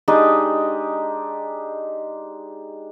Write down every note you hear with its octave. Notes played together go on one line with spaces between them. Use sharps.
G#3 D4 D#4 G4